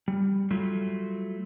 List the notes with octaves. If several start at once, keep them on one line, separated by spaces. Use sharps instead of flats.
G3
F#3 G3 A3 F4